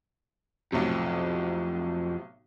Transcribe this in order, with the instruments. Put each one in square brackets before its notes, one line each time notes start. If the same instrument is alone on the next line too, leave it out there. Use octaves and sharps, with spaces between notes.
[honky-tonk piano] B1 A2 C3 [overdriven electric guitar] F2